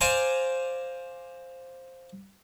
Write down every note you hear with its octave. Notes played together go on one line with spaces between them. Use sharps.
C5 D5 F5 G#5 A#5